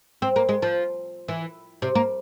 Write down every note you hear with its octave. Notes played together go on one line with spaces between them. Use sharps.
C4
A#3
G#3
F3
E3
C3
A#3